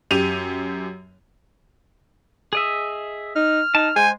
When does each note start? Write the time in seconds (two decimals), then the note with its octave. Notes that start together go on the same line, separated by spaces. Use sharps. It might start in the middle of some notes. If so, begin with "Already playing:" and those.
0.11 F#2 G4 D#7 F7
2.53 G#4 D#5 E5
3.36 D#4 F6
3.75 D#4 A5
3.96 G#3 C5 G#5